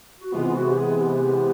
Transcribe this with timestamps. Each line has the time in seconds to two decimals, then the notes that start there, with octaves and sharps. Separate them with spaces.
0.21 F#4
0.32 C3 E3 G#3 B3 F4
0.55 F#4
0.70 G4
0.77 G#4
0.99 G4